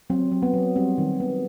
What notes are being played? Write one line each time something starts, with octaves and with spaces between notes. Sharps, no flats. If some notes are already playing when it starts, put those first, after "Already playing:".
F#3 C4
F#3
B3
F#3
G3 C4
D#3
B3